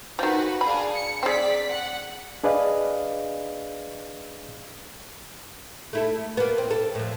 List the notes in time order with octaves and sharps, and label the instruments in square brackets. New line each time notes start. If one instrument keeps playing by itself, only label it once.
[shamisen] D#3 F3 [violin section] F#4 B4
[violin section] D4 G#4 F5 [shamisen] B5
[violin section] C#7
[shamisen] C4 G#4 [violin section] D5 B6
[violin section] F#5
[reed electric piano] D4 G#4 B4 D5 D#5 F5
[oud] A3 E4 A4
A#3 B3
C4
A4
F2 A2